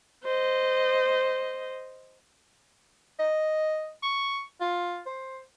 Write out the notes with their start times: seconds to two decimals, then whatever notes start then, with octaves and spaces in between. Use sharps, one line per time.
0.24 C5 D#5
3.19 D#5
4.03 C#6
4.61 F4
5.06 C5